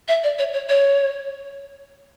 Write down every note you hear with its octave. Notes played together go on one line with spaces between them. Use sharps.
E5
D5
C#5
C#5
C#5